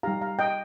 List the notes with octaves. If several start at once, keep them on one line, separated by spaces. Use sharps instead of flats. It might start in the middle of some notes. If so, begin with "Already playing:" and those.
G3 D#4 G4 F5 A#5
F5 A#5
D#5 G5